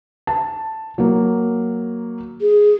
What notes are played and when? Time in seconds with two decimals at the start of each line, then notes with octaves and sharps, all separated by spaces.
0.27 A5
0.98 F#3 A#3
2.41 G#4